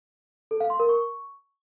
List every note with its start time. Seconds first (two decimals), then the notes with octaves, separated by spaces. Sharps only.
0.51 A4
0.60 F5
0.70 C6
0.80 A#4
0.89 C#6